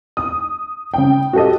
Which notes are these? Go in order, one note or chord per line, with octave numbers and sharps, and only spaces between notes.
D#6
C#3 G5
F#4 G4 A4 D#5